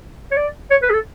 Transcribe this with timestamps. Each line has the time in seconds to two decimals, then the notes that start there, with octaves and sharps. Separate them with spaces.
0.32 C#5
0.36 D5
0.71 C#5
0.83 B4
0.90 G#4
0.93 A4